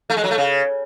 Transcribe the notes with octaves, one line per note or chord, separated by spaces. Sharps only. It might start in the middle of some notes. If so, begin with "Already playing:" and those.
A3
G#3
F#3
A3
C#3